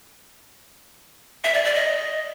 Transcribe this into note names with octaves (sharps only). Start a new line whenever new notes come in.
E5
D5
D5
D#5